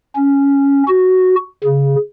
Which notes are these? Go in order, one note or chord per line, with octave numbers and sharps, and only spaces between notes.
C#4
F#4
C#3